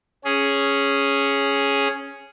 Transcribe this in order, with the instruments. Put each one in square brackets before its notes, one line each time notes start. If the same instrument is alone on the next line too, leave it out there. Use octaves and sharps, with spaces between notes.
[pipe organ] C#4 G#4